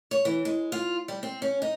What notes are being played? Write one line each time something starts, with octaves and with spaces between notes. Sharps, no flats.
C#5
E3
G#3
F4
G3
C4
C#4
D#4